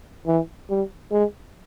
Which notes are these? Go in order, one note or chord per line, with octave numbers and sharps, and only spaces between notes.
E3
G3
G#3